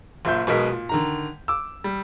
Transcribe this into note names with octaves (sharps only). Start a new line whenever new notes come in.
F#1 A#2 E5 G6
B1 B2 G#3 A#4 D#5 B6
A#2
D3 D#3 A#5
D6 E6
G3